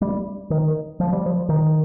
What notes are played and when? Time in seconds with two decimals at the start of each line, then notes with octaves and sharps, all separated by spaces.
0.01 G3
0.50 D#3
1.00 F3
1.13 G3
1.26 F3
1.49 D#3